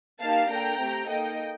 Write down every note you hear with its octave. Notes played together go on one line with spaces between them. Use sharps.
A#3 D#4 G4 F5 A5
A#3 D4 A4 G5 A#5
A3 C4 G4
A#3 D#4 A4 D#5 G5